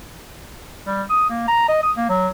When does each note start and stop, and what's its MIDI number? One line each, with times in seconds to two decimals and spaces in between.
0.87 1.03 55
1.10 1.28 87
1.30 1.48 58
1.48 1.67 82
1.69 1.78 75
1.83 1.92 87
1.97 2.09 58
2.09 2.28 54